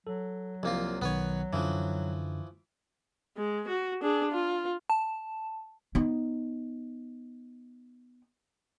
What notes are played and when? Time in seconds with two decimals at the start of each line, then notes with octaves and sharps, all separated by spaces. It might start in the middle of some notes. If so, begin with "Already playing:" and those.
0.07 F#3 A4
0.63 C2 F3 A#3 F4
1.02 B1 D#3 B3 B4 C#5
1.53 F#2 D3 E3 F3
3.37 G#3
3.68 F#4
4.02 D4 G#4
4.31 F4
4.90 A5
5.95 B3 D#4